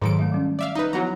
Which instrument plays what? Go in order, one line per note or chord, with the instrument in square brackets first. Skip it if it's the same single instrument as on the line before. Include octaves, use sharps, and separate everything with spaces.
[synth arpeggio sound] G#2 A4 D7 [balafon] D#3 F#3 C6
[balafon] A3 D4 E5
G3 A3 C#4
[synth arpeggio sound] D5 E5 F5
D#4 B4
[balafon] F3 B3 E4 [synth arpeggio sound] F#3 F#5 A#5